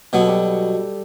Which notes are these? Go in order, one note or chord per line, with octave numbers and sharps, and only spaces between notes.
B2 F#3 B3 G4
A4
G3 G4